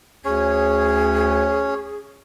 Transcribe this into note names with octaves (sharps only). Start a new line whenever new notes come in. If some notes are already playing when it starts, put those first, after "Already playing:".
D2 C#4 G#4 C#5